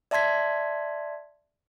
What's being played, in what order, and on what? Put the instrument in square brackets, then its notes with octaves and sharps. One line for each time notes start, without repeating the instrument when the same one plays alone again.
[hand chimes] D5 E5 A5 C6 G#6 B6